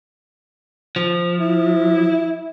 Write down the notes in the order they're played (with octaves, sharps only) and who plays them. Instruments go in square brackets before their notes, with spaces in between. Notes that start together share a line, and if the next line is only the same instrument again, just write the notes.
[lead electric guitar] F3
[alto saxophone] E4